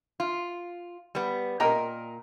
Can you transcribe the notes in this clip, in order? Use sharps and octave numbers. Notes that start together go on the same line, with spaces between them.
F4
G3 B3
A#2 A#4 D#5 G5 A#5